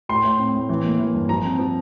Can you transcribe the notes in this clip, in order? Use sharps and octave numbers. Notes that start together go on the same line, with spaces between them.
A2 C6
A2
C4
A2
E3
A#3
E3
G2
F3 A#5
C4
F3